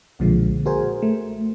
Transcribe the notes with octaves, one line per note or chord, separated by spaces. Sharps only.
B1 A#2 D3 F3 G#3
F#4 G#4 A#4 C5 G#5
A3